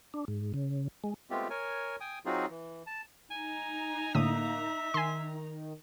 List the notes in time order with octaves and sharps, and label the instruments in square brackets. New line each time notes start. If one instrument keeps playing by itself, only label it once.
[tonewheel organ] D4
G#2
C#3
G#3
[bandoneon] G#3 A3 B3 C4 F4 G4
A#4 C#5 G#5
G5 G#5 D#6
F#3 C4 D#4 F4 F#4 G#4
E3
A5
[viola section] D#4 A#5 [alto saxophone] G#5
[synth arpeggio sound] A2 D3 D#6 [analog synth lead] A#3 [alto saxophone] E5
[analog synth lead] D#3 [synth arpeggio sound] G#5 C6